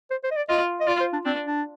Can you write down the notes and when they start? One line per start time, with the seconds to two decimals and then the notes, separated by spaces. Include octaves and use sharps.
0.10 C5
0.24 C5
0.31 D#5
0.36 D5
0.49 F4 D#5
0.80 D#5
0.87 F4 D5
1.00 C5
1.13 D4
1.25 C4 D4
1.45 D4